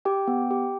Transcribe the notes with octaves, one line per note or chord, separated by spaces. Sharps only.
G4 G5
B3
G4